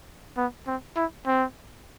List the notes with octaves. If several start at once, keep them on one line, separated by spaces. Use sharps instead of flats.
B3
C4
E4
C4